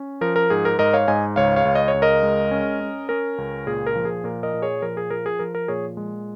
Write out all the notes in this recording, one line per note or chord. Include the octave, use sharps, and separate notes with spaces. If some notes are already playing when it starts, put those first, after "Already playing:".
Already playing: C#4
F3 A#4
A#4
G#2 G#4
A#4
G#2 A#4 D#5
C#5 F5
G#2 D#5 G#5
C#2 C#5 F5
C#5 F5
C#2
D#5
C#5
C#2
A#4 D#5
G#3
C#4
C#4
C#4 A#4
C#2
A#2 G#4
A#4
F3
G#4
A#2 A#4
A#4 D#5
A#2
G#4 C#5
F3 A#4
G#4
F3 A#4
G#4
F3 A#4
A#4
A#2 G#4 C#5
G#3